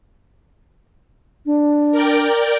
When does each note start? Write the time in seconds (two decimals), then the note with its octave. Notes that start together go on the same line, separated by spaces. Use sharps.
1.46 D4
1.91 A#4 D5 G5